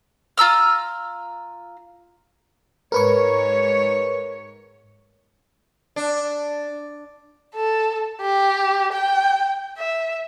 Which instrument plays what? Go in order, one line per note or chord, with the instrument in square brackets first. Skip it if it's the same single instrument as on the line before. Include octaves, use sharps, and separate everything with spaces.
[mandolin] F4 A#5 E6 F6
[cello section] G#2 C#5 [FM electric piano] A#4 B4 C#6
[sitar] D4
[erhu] A4
G4
G5
E5